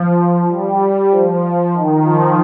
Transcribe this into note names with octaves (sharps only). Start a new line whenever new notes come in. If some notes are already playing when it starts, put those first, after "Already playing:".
Already playing: F3
G3
G3
F3
F3
D#3
F3